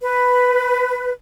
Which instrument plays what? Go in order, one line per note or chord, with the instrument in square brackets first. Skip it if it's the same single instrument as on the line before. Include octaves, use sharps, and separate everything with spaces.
[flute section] B4